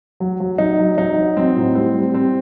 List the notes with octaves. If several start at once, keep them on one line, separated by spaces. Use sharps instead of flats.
F#3
F#3
F#3 D#4
F#3
F#3 D#4
F#3
F#3 C4
A2
G3 C4
G3
G3 C4